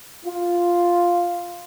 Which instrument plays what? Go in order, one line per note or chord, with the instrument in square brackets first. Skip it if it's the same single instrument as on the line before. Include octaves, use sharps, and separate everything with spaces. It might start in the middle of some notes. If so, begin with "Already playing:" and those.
[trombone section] F4